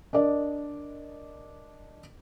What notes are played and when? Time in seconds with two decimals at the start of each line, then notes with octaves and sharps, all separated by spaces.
0.13 D4 A#4 D5 D#5